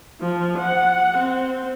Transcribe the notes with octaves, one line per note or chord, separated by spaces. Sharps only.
F3
F#5
C4